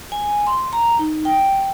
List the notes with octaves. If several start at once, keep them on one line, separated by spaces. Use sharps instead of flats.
G#5
C6
A#5
D#4
G5